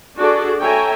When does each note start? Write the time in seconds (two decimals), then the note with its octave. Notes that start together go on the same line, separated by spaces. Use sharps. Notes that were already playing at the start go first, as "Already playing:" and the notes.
0.17 D4 F#4 G#4 A4 D5
0.60 A4 C#5 E5 G5 G#5 A#5